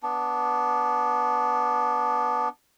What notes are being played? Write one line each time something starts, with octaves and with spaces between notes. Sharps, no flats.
B3 D4